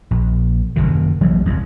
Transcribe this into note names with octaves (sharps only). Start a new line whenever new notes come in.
A#1
F#1 C#2 C3 D#3
A#1 E3 F#3 G#3
E1 C2